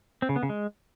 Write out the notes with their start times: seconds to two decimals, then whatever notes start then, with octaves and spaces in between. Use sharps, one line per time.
0.22 C4
0.29 C#3
0.36 B3
0.43 C#3
0.49 G#3